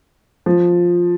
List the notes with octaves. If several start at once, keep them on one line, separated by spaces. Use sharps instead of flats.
F3